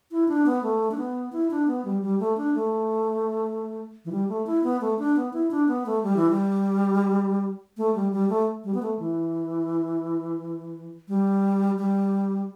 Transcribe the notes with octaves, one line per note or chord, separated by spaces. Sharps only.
E4
D4
B3
A3
D4
B3
E4
D4
B3
G3
G3
A3
D4
A3
E3
G3
A3
E4
B3
A3
D4
B3
E4
D4
B3
A3
G3
E3
G3
A3
G3
G3
A3
G3
B3
A3
E3
G3
G3